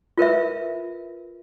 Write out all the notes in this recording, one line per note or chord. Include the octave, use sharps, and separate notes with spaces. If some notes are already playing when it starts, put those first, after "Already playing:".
F4 A#4 B4 E5